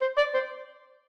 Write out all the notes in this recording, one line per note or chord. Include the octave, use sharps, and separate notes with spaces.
C5
D5
C5